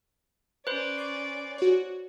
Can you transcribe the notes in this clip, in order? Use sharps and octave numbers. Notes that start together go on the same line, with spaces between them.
C#4 B4 C5 D5
C#6 D6 C7
F#4 C#5